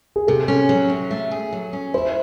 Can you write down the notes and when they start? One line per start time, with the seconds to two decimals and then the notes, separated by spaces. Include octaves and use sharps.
0.16 G#4
0.27 C3 A4
0.48 C#4
0.69 F#3
0.90 C3
1.11 A3
1.31 G#4
1.53 F#3
1.73 C#4
1.94 E4 C5